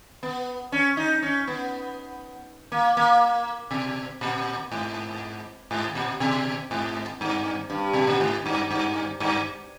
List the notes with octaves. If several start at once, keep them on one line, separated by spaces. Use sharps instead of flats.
B3
C#4
D#4
C#4
B3
A#3
A#3
B2
A#2
G#2
G#2
A#2
B2
G#2
G2
G2
B2
A#2
G#2
G2
G2
G2